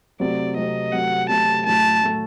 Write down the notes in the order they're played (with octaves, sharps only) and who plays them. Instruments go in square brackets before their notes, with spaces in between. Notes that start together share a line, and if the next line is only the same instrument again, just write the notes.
[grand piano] C3 F#3 A3 C4 [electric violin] D5
[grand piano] C3 F#3 A3 C4 [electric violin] D#5
[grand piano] C3 F#3 A3 C4 [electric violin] F#5
[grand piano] C3 F#3 A3 C4 [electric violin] A5
[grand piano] A2 F#3 A3 [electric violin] A5
[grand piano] A2 F#3 A3